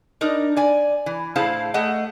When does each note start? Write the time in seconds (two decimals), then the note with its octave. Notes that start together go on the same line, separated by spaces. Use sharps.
0.21 D4 D#4 A#4
0.56 D5 G#5
1.06 E3
1.36 A2 E4 G#4 C5 F5 A5
1.74 A3 G#4 D#5 F#5 G5